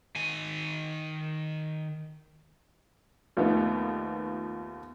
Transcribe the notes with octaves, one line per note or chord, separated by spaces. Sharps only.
D#3 G#5
D#2 F3 A3 B3 D#4